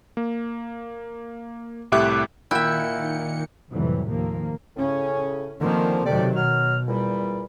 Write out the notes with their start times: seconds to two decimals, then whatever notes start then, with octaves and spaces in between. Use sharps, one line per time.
0.17 A#3
1.92 C2 A2 G4 E5 D6 F#6
2.51 A#2 D#3 E4 E5 F#5 G5 C#7
3.74 F2 A2 C3 E3 F#3 G3
4.11 D#2 D#3 F3 A#3
4.76 A2 C#3 C#4
5.61 A#2 D3 D#3 F3 A#3 C4
6.06 C3 D#3 F#3 G4 A4 D5
6.37 B2 F#3 F6
6.88 E2 A#2 G3